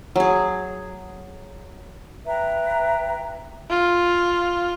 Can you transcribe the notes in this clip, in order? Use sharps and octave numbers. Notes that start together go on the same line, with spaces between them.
F#3 G#4
B4 E5 G5 A#5
F4